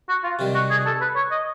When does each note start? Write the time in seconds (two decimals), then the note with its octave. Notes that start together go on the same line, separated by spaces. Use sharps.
0.09 F#4
0.24 F4
0.39 C3 D#3 G3
0.55 F#4
0.71 G#4
0.86 A4
1.01 B4
1.16 C#5
1.31 D#5